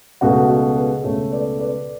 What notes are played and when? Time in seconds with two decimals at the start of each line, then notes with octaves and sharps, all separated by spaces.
0.21 C#2 B2 A3 F#4
0.49 F#4
0.77 G#4 B4
1.04 C#2 B2 A3 A4 C#5
1.31 B4 D5
1.59 B4 D5